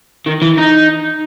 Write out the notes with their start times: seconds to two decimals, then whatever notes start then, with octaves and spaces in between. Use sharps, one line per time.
0.26 D#3
0.42 E3
0.58 D#4